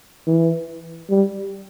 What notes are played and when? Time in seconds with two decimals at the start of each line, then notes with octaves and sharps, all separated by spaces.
0.27 E3
1.10 G3